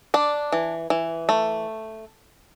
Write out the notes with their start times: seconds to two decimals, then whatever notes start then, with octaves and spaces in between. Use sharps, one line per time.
0.14 D4 D5
0.52 E3
0.90 E3
1.29 A3